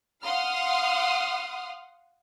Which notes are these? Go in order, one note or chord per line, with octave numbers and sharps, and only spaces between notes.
F5 F#5 C6 D#6 F6